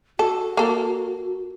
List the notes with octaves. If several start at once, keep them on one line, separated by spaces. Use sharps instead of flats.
F#4 A4
A#3 A4